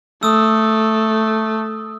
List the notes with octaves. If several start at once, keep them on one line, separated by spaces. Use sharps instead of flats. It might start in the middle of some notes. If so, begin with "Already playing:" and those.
A3 D#6 E6